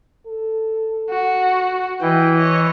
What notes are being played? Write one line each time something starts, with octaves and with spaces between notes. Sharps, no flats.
A4
F#4
E3 E4 D#5 G5
C#5 D#5